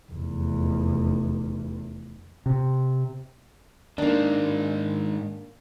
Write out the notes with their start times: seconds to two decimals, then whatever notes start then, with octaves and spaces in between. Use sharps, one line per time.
0.12 F1 E2
2.46 C3
3.98 G#2 D#3 A#3 D4